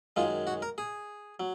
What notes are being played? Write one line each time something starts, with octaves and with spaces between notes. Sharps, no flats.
F#2 D#3 G#3 F4
F#4
A#4
G#4
F#3